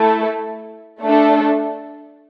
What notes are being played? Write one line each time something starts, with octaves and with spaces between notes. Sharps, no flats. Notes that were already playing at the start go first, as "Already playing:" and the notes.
Already playing: A3 E4 A4
A3 D4 A4